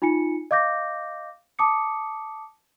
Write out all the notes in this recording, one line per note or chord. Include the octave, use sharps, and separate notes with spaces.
D#4 F4 G#5 C#7
D#5 F5 D6 G6 A#6
A5 D6 D#6 C#7